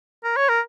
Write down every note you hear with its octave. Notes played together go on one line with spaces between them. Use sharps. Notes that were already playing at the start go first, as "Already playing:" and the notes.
A#4
C#5
A#4